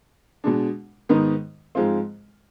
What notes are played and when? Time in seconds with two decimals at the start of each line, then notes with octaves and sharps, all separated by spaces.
0.44 B2 G#3 D4
1.09 G#2 D#3 B3 D#4
1.75 G#2 F3 G#3 C4 F4